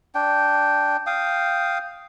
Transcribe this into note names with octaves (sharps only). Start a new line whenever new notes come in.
D4 G5
F5 G5 D#6